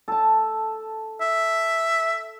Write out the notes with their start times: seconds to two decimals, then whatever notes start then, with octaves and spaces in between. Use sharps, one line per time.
0.08 A4 A5
1.21 E5